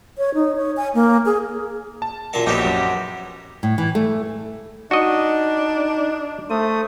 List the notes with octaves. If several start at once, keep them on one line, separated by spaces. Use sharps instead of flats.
C#5
D#4
C#5
G#5
A#3
G#4
A5
F#2 A#2 A5
A#1 F#3 B3 D#4 G4
F#2
A2
E3
A3
D4 D#4 F#4 D#5
A3 C5 D#6